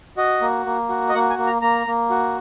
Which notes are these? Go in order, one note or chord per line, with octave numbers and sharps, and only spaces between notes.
F#4 D#5
A#3
A#3
F#4
D#5
A#3 F#5
G#5
A#3
A#5
A#3 A#5
A#3
F#4